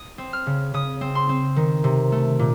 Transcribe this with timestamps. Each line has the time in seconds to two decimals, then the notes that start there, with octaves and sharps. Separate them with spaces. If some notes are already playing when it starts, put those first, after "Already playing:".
Already playing: D#6
0.18 C4
0.33 F6
0.46 C#3
0.74 C#3 D#6
1.01 C4
1.15 C6
1.29 C4
1.56 D#3
1.84 C3
2.12 A3
2.39 A#2